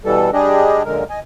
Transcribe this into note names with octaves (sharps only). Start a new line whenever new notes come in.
B2 E3 G3 A4
G3 D4 G4 G#4 D#5
F#2 A#2 D3 G#3 A#4
D#5 G#5